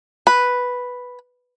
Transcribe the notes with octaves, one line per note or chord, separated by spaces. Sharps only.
B4